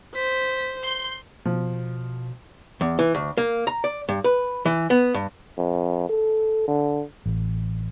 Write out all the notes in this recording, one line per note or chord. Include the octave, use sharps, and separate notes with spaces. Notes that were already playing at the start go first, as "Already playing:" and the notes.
C5 B6
C6 G6
B2 F3
E2
E3
D2
A#3
A#5
D5
G2
B4
E3
B3
G2
F2
A4
D3
A1